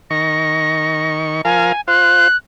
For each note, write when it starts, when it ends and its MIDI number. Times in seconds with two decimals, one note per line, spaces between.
0.10 1.41 51
0.10 1.41 85
0.10 1.13 94
1.45 1.72 53
1.45 1.72 70
1.45 1.72 77
1.45 1.81 80
1.88 2.28 65
1.88 2.28 72
1.88 2.36 90